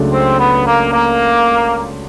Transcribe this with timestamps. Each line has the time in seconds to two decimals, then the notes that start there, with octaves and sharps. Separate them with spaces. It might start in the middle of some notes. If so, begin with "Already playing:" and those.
Already playing: C#2 C#3 F#3 A3 D4
0.12 C4
0.39 B3
0.66 A#3
0.92 A#3